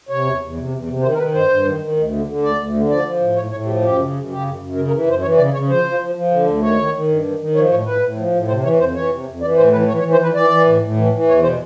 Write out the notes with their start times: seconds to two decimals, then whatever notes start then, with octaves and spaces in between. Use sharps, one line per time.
0.09 C3 C#5
0.25 E2
0.41 E2
0.56 C3
0.72 E2
0.87 C3
1.02 D#3 C5
1.13 A#4
1.18 D#3 B4
1.34 G2 C5
1.49 G2
1.65 D#3
1.81 D#3
1.96 D2
2.12 D3
2.27 D3
2.42 D2 D5
2.57 D2
2.74 D3
2.89 F3 D5
3.04 F3
3.20 A2
3.36 A2 C#5
3.51 A2 C#5
3.66 F3 G4
3.82 F#2 G4
3.97 C#3
4.13 F#2
4.29 C#3 G4
4.44 F#2
4.60 F#2
4.75 C#3 A#4
4.87 A#4
4.91 E3
5.06 F#2 C5
5.21 E3 C#5
5.37 C#3 D5
5.53 C#3 C#5
5.69 F3 C5
5.84 F3
6.00 F3
6.15 F3
6.31 D3
6.46 D2
6.62 D#3 C#5
6.78 D#3
6.93 D#3
7.08 G2
7.25 D#3
7.39 D#3
7.54 F3 C#5
7.70 A2 C#5
7.86 A2 B4
8.01 A2
8.17 F3
8.32 A2
8.48 C3 C5
8.63 E3 C#5
8.79 F2 C5
8.95 E3 C#5
9.10 C3
9.26 F2
9.41 E3 D5
9.56 A2 C5
9.72 E3 B4
9.88 E3 C#5
9.99 C#5
10.03 E3
10.12 C5
10.20 E3 B4
10.34 E3 D5
10.50 E3
10.66 A2
10.82 A2
10.96 E3
11.13 E3
11.28 E2 C#5
11.43 B2 C5